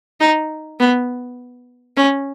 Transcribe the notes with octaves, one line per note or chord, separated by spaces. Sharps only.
D#4
B3
C#4